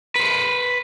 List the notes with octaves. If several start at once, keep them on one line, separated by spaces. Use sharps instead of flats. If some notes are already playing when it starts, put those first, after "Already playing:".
B4 C5